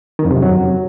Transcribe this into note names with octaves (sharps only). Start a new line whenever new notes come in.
D#3
F2
C3
F#2
F#3